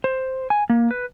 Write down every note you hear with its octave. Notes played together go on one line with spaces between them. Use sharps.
C5
G#5
A#3
B4